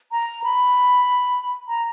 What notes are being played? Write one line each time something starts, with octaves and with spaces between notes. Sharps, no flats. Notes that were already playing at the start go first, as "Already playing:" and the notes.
A#5
B5
A#5